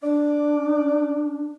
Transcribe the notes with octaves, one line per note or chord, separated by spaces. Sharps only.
D4 D5